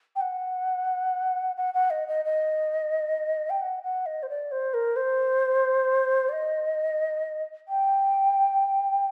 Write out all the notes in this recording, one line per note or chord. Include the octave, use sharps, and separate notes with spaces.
G5
F#5
F#5
F#5
D#5
D#5
D#5
G5
F#5
F#5
D#5
C5
D5
C5
A#4
C5
D5
D#5
G5